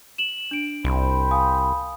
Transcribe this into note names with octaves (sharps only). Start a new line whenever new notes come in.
E7 F#7
D4 D7
C2 C5 G5 B5
F5 G#5 D#6